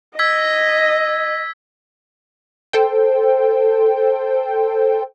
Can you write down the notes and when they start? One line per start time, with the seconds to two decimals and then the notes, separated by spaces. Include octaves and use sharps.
0.19 D#5 E6 G#6 B6
2.73 A4 C5 G5